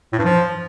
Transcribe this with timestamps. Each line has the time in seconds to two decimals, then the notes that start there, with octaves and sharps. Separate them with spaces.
0.13 A2
0.19 G2
0.25 F3